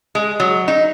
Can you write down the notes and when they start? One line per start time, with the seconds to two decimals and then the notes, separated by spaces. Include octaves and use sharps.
0.15 G#3
0.40 F#3
0.68 D#4